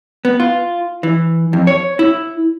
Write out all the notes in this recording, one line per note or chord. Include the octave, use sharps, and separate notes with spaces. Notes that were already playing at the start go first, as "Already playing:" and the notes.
B3
F4
E3
F2
C#5
E4